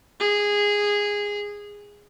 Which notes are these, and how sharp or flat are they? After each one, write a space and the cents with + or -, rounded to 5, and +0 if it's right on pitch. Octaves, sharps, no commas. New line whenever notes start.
G#4 -10